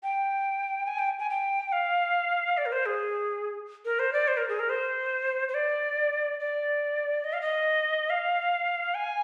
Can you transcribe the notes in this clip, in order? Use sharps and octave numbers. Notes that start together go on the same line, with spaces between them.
G5
G#5
G5
G#5
G5
F5
D5
A#4
C5
G#4
A#4
C5
D5
C5
A#4
G#4
A#4
C5
C5
D5
D5
D#5
F5
D#5
F5
G#5